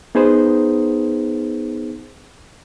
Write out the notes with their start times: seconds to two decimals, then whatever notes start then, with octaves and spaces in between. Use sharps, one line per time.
0.15 B3 D#4 G#4 B4 C5